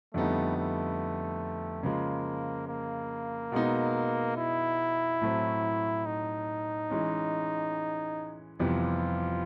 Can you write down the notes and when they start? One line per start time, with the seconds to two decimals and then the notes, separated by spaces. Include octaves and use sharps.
0.14 F2 D3 G3 A3 B3 D#4
0.57 A3
1.83 C#3 F3 G#3 A#3
2.68 A#3
3.52 B2 G#3 B3 D#4
4.37 E4
5.21 A2 F#3 A3 C4
6.06 D#4
6.90 E3 G#3 C#4
8.59 F2 C3 E3 G3 B3 F4